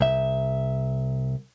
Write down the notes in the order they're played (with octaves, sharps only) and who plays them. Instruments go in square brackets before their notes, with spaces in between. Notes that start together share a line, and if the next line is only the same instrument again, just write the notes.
[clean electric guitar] C2 E5